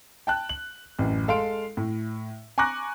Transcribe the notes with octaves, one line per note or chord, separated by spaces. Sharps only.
G5 A5 F#6
F#7
A1 F#2
G#3 A4 F5 C6 D7
A2
G#5 A#5 C#6 D6 F#6 A#6